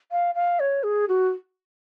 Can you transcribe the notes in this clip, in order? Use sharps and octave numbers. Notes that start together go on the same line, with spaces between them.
F5
F5
C#5
G#4
F#4